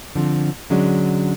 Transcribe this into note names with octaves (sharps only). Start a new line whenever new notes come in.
D3 F3 C4
D3 F#3 G#3 C#4 D4